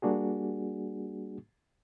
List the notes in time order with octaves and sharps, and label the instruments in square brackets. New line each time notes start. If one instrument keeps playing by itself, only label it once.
[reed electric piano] G3 A#3 D4 F#4 G#4